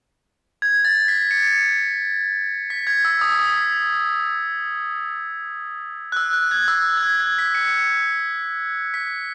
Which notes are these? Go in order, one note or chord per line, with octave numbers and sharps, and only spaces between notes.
G#6
A6
B6
C#7
B6
G#6
E6
D#6
D#6
F#6
E6
F#6
G#6
E6
G#6
F#6
G#6
B6
C#7
B6